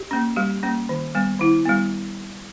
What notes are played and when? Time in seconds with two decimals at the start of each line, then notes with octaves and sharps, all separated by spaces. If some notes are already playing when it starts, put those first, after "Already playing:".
Already playing: G4
0.11 A#3 C#4
0.36 G3 G4
0.63 A#3 C#4
0.89 D#3
1.15 G3 B3
1.40 D#3 E4
1.66 G3 B3